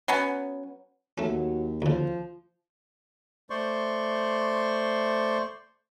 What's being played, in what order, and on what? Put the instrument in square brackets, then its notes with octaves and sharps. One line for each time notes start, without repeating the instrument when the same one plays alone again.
[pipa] F#3 B3 C#4
[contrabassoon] D#2 [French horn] F#3 [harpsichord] A3 C#4
[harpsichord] D2 C#3 [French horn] F3
[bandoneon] A3 C5 D5 C6 C#6